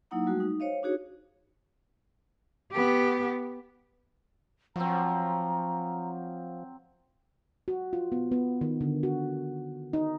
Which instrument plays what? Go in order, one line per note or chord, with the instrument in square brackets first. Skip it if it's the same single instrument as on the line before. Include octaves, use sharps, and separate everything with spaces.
[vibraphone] F#3 A#3 D#4 E4 F#5 A#5
G3 A3 F#4
D#4
C5 C#5 D#5 F5
D4 D#4 F#4 G#4 C#5
[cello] B3 G4
[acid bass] F3 [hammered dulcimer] F#3 C4 [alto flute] A#5
[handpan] F#4
F4
B3
B3
D#3
D3
F#4
D#4